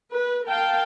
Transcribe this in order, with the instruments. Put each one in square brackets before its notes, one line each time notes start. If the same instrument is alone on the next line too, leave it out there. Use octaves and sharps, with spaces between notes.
[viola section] B4
A#4 F5 G5 A5